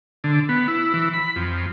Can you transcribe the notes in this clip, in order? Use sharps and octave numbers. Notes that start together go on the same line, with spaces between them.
D3
B3
E4
E3
B5
F2